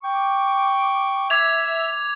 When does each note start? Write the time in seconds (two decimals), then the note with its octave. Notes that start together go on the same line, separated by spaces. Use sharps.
0.03 G5 C#6 D6
1.30 E5 D6 G#6 F7